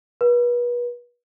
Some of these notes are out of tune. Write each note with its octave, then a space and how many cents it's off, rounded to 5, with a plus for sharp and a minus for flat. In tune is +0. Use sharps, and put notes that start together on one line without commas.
B4 -35